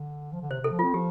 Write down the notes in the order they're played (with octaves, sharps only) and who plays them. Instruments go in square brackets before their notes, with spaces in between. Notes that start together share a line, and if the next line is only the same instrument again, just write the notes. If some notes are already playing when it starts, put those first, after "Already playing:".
Already playing: [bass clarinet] D3
F3
D3
[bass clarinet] C3 [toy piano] C5
[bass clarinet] C3 [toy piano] A4
[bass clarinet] F3
[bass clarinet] C4 [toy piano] F4
[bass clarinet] F3 [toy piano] G4